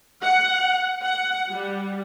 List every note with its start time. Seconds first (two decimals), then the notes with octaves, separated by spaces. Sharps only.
0.21 F#5
1.04 F#5
1.51 G3